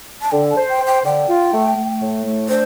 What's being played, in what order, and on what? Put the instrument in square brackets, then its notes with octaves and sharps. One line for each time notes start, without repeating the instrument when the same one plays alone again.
[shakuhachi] A5
[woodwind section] D3 [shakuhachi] G5
[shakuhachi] A5
[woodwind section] C5
[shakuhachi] G5
[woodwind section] C5
[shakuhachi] G5
[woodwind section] D3 [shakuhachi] G5
[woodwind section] F4
A3
A3
A2
A3
[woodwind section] D4 [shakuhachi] C5